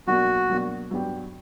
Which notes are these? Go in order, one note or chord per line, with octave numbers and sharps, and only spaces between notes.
B2 F#3 A#3 D4 F#4
B2 F#3 A#3 D4
G2 F#3 B3 D4 G4